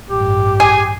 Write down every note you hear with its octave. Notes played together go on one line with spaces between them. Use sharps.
A1 G2 G4
G#4 G#5